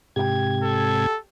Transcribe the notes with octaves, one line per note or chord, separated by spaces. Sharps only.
G#2 C3 G4 G5 G#6
A4